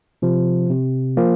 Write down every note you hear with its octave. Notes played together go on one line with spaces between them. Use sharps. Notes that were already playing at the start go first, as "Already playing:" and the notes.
C3 F3
C3
F3 A#3